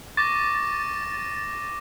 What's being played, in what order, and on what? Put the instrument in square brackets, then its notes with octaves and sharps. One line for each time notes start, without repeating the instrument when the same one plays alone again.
[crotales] C#6 D6 A#6 [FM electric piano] A6